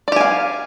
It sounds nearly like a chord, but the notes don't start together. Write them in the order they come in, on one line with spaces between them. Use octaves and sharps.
D5 G4 G#5 F5